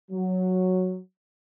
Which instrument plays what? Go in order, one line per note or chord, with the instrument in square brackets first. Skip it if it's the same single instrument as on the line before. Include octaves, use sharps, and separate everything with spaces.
[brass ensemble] F#3